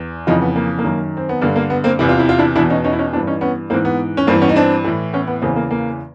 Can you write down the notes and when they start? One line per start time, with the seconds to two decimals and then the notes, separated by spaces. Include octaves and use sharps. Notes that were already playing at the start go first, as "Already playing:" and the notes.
Already playing: E2
0.27 F2 C#3 E3 D#4 F4
0.42 B3
0.56 A#3
0.78 A#3
0.84 F#2 D#3
1.17 C4
1.29 B3
1.41 G2 D3 A#3
1.56 A#3
1.70 B3
1.84 A#3 C4
1.99 E2 C3 E3 E4
2.09 F4
2.19 E4
2.29 F4
2.39 D4 E4
2.56 E2 B2 D4 E4
2.70 C#4 D#4
2.84 C#4 D#4
2.93 E4
2.99 C#4 D#4
3.13 E3 C4 D4
3.17 G2
3.27 C#4 D#4
3.41 B3 C#4
3.70 G#2 E3 A#3 C4
3.85 B3
4.17 C#4
4.27 G2 E3 A#3 C4
4.42 B3 C#4
4.49 D#4
4.56 C4 D4
4.84 A2 E3
5.13 B3 C#4
5.27 B3
5.42 E2 C#3 E3 A#3 C4
5.56 A#3
5.71 A#3